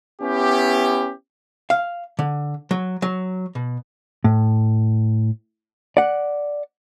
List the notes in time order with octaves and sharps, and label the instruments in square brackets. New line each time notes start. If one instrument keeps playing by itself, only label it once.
[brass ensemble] B3 C#4 E4 G4
[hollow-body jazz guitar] F5
D3
F#3
F#3
B2
A2
D5 F#5